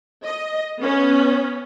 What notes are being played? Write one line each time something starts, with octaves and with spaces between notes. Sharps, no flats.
D#5
B3 C#4